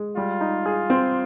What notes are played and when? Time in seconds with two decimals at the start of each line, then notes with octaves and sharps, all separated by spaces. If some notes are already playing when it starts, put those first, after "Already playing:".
Already playing: G#3
0.16 G3 F4
0.41 D#4
0.66 G#4
0.90 C4